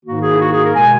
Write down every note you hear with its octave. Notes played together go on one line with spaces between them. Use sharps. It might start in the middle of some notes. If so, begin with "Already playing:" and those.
G#2 D#3 A#3 F#4
G#4
E4
F#4
G#4
A#4
B2 G#3 G#5